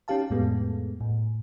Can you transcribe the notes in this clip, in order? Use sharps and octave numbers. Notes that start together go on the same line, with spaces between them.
C#4 D#4 G4 F5 A5
F2 A2 G#3 A3 B3
A2